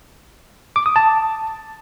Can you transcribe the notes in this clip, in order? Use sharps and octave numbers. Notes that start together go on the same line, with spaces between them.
D6
D#6
A5